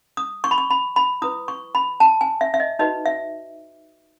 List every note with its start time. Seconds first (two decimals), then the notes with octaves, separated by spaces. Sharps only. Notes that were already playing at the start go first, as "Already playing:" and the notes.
0.17 D#6
0.44 C#6
0.51 B5
0.58 C#6
0.70 B5
0.96 B5
1.22 E4 B4 D#6
1.48 C#6
1.75 B5
2.00 A5
2.21 G#5
2.41 E5
2.54 E5
2.60 D#5
2.79 D#4 F#4 B4 D#5
3.06 E5